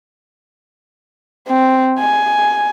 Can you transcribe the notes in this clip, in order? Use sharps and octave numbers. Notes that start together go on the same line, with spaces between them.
C4
G#5